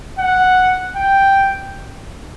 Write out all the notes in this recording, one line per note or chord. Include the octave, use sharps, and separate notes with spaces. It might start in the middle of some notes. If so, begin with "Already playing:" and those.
F#5
G5